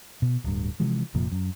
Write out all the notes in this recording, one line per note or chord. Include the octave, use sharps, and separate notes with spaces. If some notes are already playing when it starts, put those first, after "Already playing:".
B2
D1 G2
C3 E3 F3 G#3
F1 F2 A#2 F3
F#2